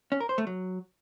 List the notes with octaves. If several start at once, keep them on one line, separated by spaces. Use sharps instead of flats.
C#4
A#4
C5
A3
F#3